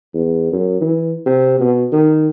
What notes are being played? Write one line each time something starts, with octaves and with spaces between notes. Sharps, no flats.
E2
F#2
E3
C3
B2
D#3